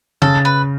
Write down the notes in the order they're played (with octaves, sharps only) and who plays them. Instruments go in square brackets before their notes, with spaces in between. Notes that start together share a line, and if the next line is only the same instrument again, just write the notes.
[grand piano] C#3 [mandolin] A4
[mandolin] B4